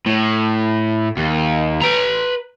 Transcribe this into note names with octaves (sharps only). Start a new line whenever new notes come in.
A2
D#2
B4 A#5